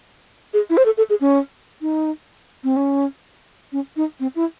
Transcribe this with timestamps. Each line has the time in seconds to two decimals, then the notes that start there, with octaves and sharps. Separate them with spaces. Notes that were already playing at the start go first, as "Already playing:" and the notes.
0.54 G#4
0.70 E4
0.77 C5
0.86 A4
0.97 A4
1.10 G#4
1.21 C#4
1.82 D#4
2.64 C4
2.76 C#4
3.72 C#4
3.97 D#4
4.20 C4
4.35 E4